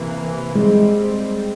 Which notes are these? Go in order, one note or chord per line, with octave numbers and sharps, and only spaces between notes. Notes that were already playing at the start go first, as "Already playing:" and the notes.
Already playing: C3 E3 A#3
A#2 G3 G#3 C4